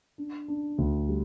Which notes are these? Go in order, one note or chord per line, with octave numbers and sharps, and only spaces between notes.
D4
D4
D2
G3